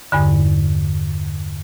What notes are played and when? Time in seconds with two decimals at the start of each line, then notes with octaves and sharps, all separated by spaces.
0.12 E2 G2 D3